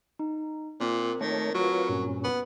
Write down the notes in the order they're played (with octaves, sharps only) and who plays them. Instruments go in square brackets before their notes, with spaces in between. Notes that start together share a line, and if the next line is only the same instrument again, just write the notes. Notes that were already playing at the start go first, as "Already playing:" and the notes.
[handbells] D#4
[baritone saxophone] A#2 [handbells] C4 A#4
[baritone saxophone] D#3 [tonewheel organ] A3 C#5
[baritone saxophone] F#3 [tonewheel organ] F4 B4 C#5
[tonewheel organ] G2 A#2 C#4
[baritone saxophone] B3